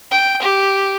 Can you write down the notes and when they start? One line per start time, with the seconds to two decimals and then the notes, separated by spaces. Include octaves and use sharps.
0.11 G5
0.42 G4